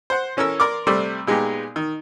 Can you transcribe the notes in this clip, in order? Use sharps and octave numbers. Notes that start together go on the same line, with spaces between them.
C5 F#5
E3 C#4 A4 A#4 E6
A#4 D5 C6 D6
C3 G3 A3 C5 D5
A#2 G#3 B3 D#4 G4
D#3